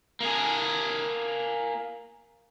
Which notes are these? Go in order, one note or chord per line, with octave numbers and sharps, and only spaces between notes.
A#3 G#4